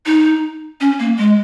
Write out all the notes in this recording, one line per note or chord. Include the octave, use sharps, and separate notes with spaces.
D#4
C#4
A#3
G#3